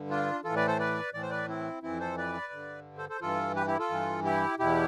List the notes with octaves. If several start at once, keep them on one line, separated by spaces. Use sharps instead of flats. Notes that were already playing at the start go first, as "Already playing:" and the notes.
Already playing: G2 D3
D4 F4
A2 E3 F4 A4
B4 D5
A4 C5
B4 D5
A2 E3 D5
C5
B4 D5
C4 E4
F2 E3 C4 E4
A4 C5
B4 D5
G2 D3
A4 C5
A4 C5
G2 E3 F4 A4
G4 B4
E4 G4
F4 A4
G2 E3
E4 G4
E2 B2 E4 G4